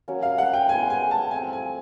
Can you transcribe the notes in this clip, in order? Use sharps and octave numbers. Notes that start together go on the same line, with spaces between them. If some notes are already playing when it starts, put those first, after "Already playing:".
F#3 A#3 C#4
F5
F#5
G5
G#3 B3 E4 G#5
G#5
A5
F3 A3 C4 G#5
G#5